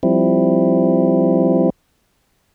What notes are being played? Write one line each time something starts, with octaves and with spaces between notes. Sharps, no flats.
F3 G3 C4 E4